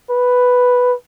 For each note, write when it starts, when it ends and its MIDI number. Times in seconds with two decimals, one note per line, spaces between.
0.10 0.94 71